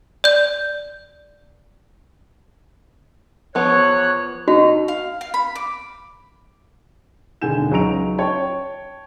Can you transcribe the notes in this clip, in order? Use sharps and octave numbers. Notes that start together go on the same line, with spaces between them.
D5 G6
E2 F3 B3 C#5 F#6
B2 D#4 F#4
F5
F5
B5
D6
E1 D3 D#3 G#5 G6 E7
C#2 F#3 D#4 A#5 D7 F7
C#5 G5 A5